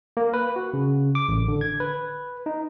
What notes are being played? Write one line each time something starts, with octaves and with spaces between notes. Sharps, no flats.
A#3
B4
F#4
C#3
D6
A1
D3
G#6
B4
D#4